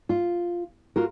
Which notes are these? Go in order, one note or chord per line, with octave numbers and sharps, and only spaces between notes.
F4
F4 F#4 A#4